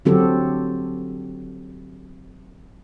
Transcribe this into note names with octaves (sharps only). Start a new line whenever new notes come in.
D3 F#3 C4 F#4 G4 A4